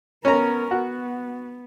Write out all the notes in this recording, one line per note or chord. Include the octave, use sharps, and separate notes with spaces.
B3 C#4 A#4 A#5
B3 F#4